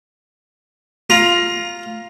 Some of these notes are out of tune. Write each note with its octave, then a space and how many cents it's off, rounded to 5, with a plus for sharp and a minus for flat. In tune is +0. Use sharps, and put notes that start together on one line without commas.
F4 +0 A#5 +20